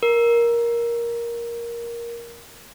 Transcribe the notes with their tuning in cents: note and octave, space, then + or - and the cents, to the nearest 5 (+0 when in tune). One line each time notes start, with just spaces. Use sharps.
A#4 +10